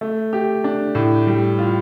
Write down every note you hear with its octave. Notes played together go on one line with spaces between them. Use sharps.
A3
G4
D4
A2
G3
F4